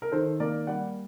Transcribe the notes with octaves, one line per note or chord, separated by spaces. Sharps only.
A#4
D#3 A4 C5
A#3 A#4 D5
G3 D5 F#5